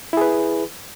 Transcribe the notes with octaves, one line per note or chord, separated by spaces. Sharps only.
E4 G#4 B4